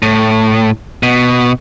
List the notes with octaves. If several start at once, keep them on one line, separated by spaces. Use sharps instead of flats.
A2
B2